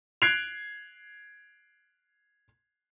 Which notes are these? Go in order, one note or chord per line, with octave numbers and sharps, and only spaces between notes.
F#6 G#6 C7 D7 F7